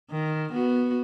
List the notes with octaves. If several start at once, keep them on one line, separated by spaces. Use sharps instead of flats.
D#3
B3 F#4